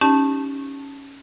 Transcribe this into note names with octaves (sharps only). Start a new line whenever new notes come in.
C#4 D#4 G4 A5